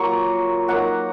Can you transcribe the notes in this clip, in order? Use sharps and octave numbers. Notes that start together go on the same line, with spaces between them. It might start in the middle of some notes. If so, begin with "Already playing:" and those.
Already playing: F#3 A#3 F4 A#5 C#6
F#3 A#3 D#4 F#5 A#5